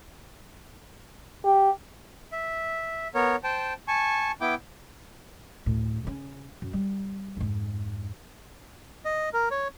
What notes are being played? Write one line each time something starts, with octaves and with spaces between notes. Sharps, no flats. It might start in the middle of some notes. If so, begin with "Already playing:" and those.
G4
E5
B3 A#4 C#5
C5 G5 A5
G#5 A5 C#6
B3 E4 G5 D6
D2 A2
C#3 C#4
F#2
G3
F2 G#2
D#5
A#4
C#5